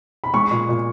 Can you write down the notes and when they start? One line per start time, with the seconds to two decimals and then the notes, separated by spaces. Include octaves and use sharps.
0.24 B5
0.34 G#3 C#6
0.51 A#2
0.69 A#2